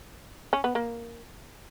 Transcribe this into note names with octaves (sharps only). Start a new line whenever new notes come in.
C#4
B3
A#3